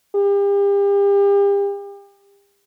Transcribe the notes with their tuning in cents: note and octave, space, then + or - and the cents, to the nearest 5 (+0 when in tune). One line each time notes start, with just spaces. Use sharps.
G4 +40